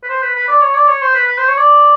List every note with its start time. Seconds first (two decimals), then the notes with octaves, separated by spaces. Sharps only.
0.03 B4
0.09 C5
0.22 B4
0.35 B4
0.48 D5
0.61 C#5
0.75 D5
0.88 C#5
1.02 C5
1.15 B4
1.28 B4
1.38 C5
1.48 C#5
1.57 D5